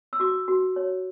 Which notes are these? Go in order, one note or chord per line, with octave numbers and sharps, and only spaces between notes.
E6
F#4 D6
F#4
C#5